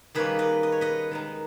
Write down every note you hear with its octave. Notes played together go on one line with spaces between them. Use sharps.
D#3 G3 A#3 C#4 G#4 B4
B4 D#5
D#5
C#5
B4 D#5
D#3 G#3 D#4